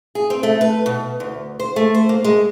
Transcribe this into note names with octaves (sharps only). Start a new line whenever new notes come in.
G#4
C4
A3
B4
B2
D2
C5
A3
C5
A#3
G#3